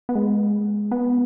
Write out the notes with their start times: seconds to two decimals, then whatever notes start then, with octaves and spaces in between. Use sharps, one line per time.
0.09 B3
0.15 G#3
0.91 B3